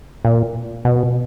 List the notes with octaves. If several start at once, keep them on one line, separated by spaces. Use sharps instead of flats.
A#2
B2